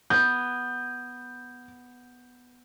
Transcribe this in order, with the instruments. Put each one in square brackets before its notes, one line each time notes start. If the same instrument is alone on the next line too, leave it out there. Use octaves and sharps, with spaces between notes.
[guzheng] B3 [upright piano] G6